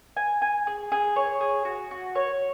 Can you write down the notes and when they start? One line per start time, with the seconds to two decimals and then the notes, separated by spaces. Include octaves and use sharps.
0.17 G#5
0.42 G#5
0.67 G#4
0.92 G#4
1.16 C#5
1.41 G#4
1.65 F#4
1.91 F#4
2.15 C#5